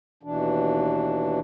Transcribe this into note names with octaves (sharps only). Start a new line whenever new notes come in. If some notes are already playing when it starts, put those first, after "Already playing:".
D#2 B2 E3 D4